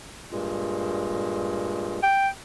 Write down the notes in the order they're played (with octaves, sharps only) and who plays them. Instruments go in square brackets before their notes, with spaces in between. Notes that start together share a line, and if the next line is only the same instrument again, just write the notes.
[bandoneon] G2 A#2 G#3
[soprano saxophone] G5